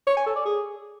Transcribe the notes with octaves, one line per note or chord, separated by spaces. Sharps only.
C#5
G#5
A4
D5
G#4